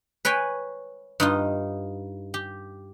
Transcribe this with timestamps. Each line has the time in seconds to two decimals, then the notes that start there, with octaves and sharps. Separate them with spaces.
0.25 B4 C#5 G5 G#5 B5
1.20 G2 D#4 F4
2.34 G4